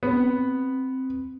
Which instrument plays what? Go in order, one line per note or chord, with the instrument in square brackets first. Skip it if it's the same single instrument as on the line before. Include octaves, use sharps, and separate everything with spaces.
[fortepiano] B3 [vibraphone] C4